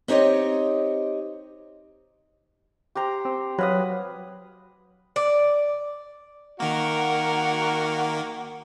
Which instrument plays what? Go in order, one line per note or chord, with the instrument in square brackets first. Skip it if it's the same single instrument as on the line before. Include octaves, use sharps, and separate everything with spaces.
[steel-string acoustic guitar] C4 D#4 G4 C#5 D#5
[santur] G4 C5 A#5
[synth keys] C4
[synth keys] F#3 [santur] B4 F5 D#6
[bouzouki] D5
[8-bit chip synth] D#3 A#3 [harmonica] F#4 [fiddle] A#4 [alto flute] F#5